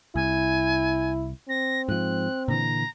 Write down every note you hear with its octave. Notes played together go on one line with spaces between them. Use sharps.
C2 E4 G#5
C4 A#6
G#2 F3 F#6
A#2 D3 E3 A#5